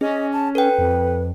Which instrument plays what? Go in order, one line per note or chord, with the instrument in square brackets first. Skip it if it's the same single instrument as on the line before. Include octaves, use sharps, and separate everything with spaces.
[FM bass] C#4 [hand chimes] G#4 [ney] D#5
[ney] A5
[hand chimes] A4 G5 [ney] B4
[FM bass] F2